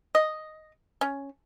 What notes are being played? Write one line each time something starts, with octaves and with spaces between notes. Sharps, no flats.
D#5
C#4